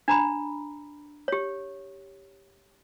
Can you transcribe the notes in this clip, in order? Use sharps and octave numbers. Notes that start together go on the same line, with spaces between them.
D4 A#5 B5
G4 C#5